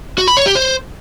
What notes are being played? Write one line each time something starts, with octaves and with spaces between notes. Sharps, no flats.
F#4
B5
C#5
G4
C5